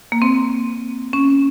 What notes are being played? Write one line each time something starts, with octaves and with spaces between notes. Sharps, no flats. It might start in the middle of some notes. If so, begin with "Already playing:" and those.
A#3
C4
C#4